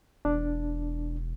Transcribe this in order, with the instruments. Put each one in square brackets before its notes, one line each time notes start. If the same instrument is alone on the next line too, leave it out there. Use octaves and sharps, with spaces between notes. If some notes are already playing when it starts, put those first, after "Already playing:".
[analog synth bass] E1 [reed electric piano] D4